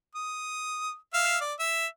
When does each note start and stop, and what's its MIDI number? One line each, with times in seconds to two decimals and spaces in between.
0.15 0.95 87
1.13 1.37 76
1.13 1.37 77
1.41 1.53 74
1.59 1.87 76